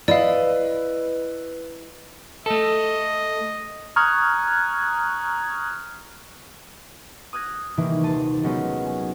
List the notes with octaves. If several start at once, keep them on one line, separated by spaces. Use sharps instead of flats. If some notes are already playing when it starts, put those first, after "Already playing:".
E4 B4 D5 D#5 F5
A3 A4 D#5
A#5 C#6 D#6 F6 F#6 G#6
D#6 F6 F#6 G#6 A#6
C3 D#3 E3 G3 A3 A#3
D#1 C5 A5 D#7
D#3 F#3 G#3 B3 C#4 D#4
G#5